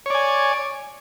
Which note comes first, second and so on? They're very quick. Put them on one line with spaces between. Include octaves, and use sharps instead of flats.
C#5 D5 G#5